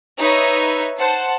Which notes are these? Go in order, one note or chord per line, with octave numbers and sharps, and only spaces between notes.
D#4 B4 C#5 E5
C5 F#5 A5